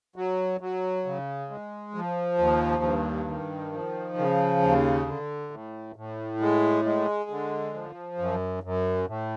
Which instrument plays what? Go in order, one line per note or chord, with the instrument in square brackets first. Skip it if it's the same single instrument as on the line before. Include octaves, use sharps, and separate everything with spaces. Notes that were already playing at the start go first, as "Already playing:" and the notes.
[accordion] F#3
F#3
C#3
G#3
F3
D#2
G2
D#3
F3
C#3
D#2
D3
A2
A2
G#3
G#3
D3
F3
F#2
F#2
A2